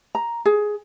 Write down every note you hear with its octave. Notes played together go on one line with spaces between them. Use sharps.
A#5
G#4